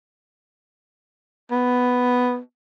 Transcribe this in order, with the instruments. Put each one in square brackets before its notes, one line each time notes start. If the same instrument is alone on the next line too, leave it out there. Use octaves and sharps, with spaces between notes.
[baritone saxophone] B3